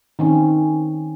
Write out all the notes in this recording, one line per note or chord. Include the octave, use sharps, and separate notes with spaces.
D#3 C4 C#4